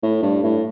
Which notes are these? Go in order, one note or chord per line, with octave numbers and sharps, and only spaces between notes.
A2
G2
A2